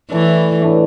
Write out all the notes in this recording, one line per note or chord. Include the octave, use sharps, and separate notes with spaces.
E3 A3 E4 A4 D5
A2 E3 A3 D4